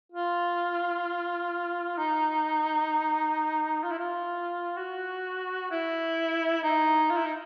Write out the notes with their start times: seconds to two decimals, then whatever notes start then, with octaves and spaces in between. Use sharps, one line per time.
0.12 F4
1.98 D#4
3.83 F4
3.92 E4
3.99 F4
4.77 F#4
5.71 E4
6.63 D#4
7.10 F4
7.17 E4
7.25 D#4